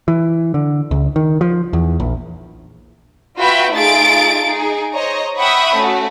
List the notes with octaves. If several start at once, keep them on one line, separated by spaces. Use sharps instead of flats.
E3
D3
C#2
D#3
F3
E2
A#1
F4 F#4 B4 E5 G5 B5
A3 D#4 F4 G#4 A6 D7
D#4 G#4
C5 C#5 D#5 A#5
E5 F#5 G5 B5 C#6 D#6
A3 C#4 F#4